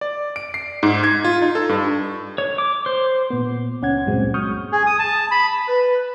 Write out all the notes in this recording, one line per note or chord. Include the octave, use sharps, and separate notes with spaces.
D5
D7
C7
G#2
G#6
F4
D#4
A4
G2
C#5
D6
C5
A#2 B3
C#2 C#4 F#5 G#6
C#2 G2 A#2 F#3 G#3 C4
C#6 D#6 F6 G6
G#4
D#6
A5
B5
B4